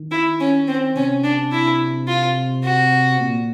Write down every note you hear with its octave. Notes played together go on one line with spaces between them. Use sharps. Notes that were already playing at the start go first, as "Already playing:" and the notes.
Already playing: D#3
E4
C#4
C4
C3 C#4
D4
E4
F4
F#4
A#2